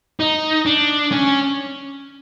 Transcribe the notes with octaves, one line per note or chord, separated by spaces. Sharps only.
D#4
D4
C#4